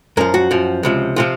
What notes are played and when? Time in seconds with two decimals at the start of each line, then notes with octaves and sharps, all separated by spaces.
0.17 F#2 F3 A#4
0.34 F#4
0.51 F#2 F3
0.83 C#2 C3 F3
1.16 C3 F3 F4